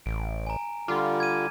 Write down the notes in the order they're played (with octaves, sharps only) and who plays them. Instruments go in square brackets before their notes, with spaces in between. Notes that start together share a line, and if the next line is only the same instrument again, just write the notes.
[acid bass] A1 [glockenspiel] D7
[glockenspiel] G#5 A#5
[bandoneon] D3 G3 [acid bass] F4 [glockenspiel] D6 F6
[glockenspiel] G#6 D#7